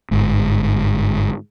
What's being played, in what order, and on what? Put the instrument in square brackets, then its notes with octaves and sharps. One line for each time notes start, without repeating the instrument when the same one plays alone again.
[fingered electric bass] G1 G#2